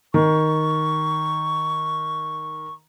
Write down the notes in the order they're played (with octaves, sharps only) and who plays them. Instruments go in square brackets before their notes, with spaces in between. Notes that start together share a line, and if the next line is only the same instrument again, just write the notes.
[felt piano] D#3 [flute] C#6